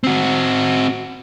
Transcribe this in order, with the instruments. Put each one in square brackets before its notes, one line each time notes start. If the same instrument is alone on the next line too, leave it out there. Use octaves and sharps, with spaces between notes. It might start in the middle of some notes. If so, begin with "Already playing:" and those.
[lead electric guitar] C4 F#4